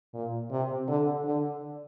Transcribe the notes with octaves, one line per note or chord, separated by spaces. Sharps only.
A#2
C3
D3
D3